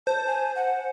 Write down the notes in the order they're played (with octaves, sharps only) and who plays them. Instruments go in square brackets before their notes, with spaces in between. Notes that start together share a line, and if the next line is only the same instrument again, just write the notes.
[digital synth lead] C5 [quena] A5
[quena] G#5
F#5